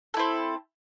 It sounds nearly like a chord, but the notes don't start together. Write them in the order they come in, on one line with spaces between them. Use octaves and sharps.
A4 E4 C4